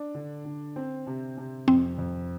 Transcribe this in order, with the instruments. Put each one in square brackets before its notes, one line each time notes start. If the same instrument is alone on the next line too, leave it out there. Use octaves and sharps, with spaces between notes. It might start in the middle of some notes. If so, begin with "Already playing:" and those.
Already playing: [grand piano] D4
D3
D3
C4
C3
C3
[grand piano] F2 [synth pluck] C4
[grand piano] F2